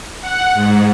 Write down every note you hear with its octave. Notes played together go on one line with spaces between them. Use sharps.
F#5
G#2